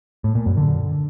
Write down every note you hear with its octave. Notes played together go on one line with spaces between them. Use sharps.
A2
A#2
F#2
D3